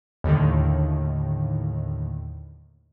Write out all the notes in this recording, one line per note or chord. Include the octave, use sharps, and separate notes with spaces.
D#2 A2 D3 D#3